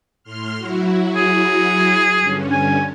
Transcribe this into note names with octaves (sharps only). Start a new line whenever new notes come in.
A2 C6 F6
F#3 E4 F#4
G#4
G2 D3 C#4
G#5